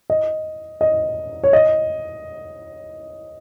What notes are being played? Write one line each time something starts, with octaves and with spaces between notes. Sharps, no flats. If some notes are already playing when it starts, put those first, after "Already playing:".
D#5
D#5
C#5
D#5